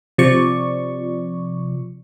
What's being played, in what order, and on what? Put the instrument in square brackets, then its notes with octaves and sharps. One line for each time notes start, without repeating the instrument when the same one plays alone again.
[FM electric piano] C3 F3 D5 C#6